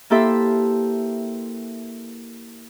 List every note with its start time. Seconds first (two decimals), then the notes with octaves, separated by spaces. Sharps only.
0.10 A#3 E4 G4 A4 C5 E5